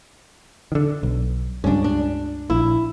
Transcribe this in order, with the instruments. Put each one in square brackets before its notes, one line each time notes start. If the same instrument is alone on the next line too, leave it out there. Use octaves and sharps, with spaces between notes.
[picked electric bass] D3 D#3
B1
[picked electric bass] C#2 G2 [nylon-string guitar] C#4 D4
[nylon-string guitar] D4
[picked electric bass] A#1 [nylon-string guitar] E4